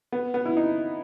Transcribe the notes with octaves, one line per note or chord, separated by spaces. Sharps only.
B3
B3
E4
D#4